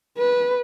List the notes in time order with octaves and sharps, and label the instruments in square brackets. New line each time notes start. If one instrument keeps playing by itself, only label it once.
[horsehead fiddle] B4